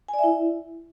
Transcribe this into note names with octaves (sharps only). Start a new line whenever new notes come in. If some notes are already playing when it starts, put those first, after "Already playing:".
G#5
D5
E5
E4